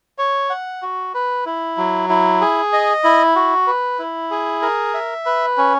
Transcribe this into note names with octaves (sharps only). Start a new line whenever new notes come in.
C#5
F#5
F#4
B4
E4
F#3
E4
G#4
D#5
E4
F#4
B4
E4
G#4
A#4
E5
B4
C#4